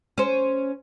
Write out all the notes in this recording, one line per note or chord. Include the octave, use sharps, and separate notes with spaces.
C#4 C5